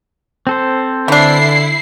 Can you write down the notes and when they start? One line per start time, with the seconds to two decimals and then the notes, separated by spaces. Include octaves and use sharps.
0.47 C4 A4 C5
1.08 D3 E3 D4 E4 C7